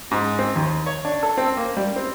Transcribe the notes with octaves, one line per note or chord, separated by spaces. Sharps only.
G#2
C4
D#2
C#5
D4
A4
C4
A#3
G3
C4